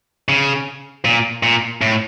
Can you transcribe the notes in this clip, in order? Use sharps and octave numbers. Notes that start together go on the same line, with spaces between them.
C#3
A#2
A#2
A2